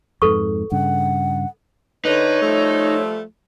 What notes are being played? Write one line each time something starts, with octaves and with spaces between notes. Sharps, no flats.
F2 G#2 A4 B4 C#6
G2 C#3 F#5
D3 D#4 B4 C#5
F3 G3 A3